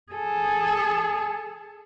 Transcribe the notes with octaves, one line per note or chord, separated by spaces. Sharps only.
G#4 A4